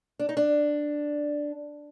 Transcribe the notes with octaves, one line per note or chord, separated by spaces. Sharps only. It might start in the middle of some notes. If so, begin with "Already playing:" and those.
D4
D#4
D4